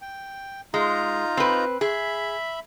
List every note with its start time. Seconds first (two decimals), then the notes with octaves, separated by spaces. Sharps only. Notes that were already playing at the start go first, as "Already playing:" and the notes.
0.02 G5
0.74 G#3 D#4 F4 A#5
1.37 C4 B4
1.81 G#4 E5 B5